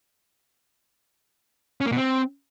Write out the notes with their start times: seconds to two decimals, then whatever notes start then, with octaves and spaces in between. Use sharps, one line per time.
1.81 C#4
1.86 A#3
1.91 B2
1.97 C4